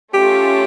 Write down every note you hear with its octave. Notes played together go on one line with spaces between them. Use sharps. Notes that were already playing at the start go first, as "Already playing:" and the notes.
A3 C#4 F4 G4